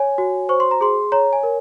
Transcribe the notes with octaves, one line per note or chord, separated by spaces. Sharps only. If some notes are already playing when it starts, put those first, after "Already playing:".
Already playing: C#5 G#5
F#4
C5 C#6
C6
A#5
G#4 C6
C#5 A#5
G#5
A#4